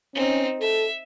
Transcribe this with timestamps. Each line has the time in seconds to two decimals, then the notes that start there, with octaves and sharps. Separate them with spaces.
0.15 C4 C#4 D#4
0.61 A4 E5